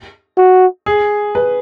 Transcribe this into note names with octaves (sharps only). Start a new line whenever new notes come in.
F#4
G#4
B4